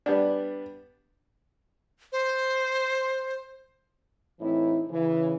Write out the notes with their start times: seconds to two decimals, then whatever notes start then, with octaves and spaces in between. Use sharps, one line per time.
0.06 G3 B3 D4
2.12 C5
4.39 A2 E3 C4 D#4 E4
4.89 C#3 E3